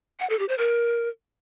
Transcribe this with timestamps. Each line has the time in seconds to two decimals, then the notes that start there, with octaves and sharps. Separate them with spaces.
0.20 F#5
0.30 A4
0.39 G4
0.49 C5
0.58 A#4